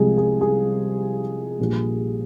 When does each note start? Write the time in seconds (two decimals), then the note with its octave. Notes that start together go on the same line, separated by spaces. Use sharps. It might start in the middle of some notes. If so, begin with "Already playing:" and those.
Already playing: C2 C3 F3 G#3 G#4
0.18 G#4
0.41 G#4
1.59 A#1 A#2 G3